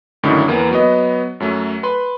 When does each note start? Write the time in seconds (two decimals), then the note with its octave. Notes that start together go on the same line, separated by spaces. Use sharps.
0.23 C#2 F#2 A2 D3 D#3
0.48 E2 A#3 B3
0.71 F#3 B3 D#5
1.40 F#2 F#3 A3
1.83 B4 B5 C6